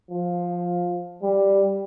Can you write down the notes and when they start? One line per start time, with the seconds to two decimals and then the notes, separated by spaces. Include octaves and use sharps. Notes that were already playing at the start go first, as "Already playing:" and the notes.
0.11 F3
1.23 G3